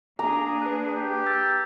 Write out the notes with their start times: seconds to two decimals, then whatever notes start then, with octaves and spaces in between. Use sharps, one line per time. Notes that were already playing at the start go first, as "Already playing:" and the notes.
0.19 A#3 D4 G#4 A#5 D6
0.62 B4 A5 F#6
0.95 G4
1.26 E6 A6